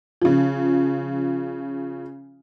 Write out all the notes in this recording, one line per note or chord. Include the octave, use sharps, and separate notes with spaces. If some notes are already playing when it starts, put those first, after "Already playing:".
C#3 F3